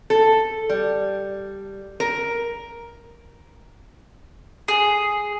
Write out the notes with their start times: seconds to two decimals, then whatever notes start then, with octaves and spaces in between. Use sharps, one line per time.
0.10 A4
0.69 G3
2.00 A#4
4.68 G#4